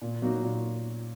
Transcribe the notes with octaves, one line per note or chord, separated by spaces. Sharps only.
A#2
F#3 A#3 D#4 F#4
A#2